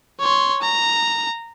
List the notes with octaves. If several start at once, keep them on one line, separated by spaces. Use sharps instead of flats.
C#5 C6
A#5